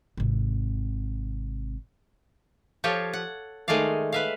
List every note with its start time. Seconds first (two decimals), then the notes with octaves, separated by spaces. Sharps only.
0.18 G#1 C3
2.84 F3 F4 G4 A4 C#5
3.13 F#5
3.68 D#3 G#3 A3 G#4 D5 F5
4.12 B4 E5 F5